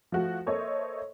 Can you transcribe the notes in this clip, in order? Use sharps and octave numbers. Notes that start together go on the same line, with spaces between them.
F3 A3 F#4
A#3 A4 C5 C#5 D#5 E5